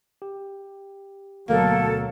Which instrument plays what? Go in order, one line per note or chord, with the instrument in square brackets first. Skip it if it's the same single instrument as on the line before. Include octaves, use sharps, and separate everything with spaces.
[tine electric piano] G4
[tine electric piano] D2 B2 [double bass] F#3 [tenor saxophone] A#3 [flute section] A4